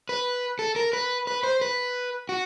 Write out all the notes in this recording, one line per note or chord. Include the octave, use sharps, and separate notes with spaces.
B4
A4
A#4
B4
B4
C5
B4
F#4